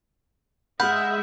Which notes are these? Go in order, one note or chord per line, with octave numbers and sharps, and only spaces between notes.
G#3 E5 F#5 B5 F6 G6